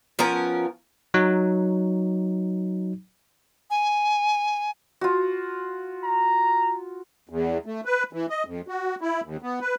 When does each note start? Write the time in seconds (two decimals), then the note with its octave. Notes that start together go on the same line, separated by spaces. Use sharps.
0.19 F3 B3 C#4 A#4
1.14 F#3 D#4
3.70 G#5
5.01 F4 F#4
6.04 A#5
7.29 E2
7.66 A3
7.85 B4
8.13 E3
8.30 D#5
8.46 F2
8.68 F#4
9.01 E4
9.24 D#2
9.42 B3
9.61 B4